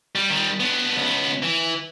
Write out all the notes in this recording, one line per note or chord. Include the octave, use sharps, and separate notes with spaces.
G3
D#3 G3
B3 D4
C#2 B3
E3